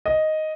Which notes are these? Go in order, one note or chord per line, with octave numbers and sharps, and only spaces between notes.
D#5